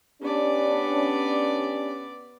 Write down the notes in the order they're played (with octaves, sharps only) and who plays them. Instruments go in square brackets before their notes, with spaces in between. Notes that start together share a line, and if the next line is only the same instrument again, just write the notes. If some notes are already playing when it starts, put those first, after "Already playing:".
[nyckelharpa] B3 D5 [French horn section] C#4 D4 G4